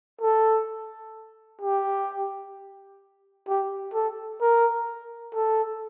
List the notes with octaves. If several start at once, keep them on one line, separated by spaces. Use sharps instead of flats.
A4
G4
G4
A4
A#4
A4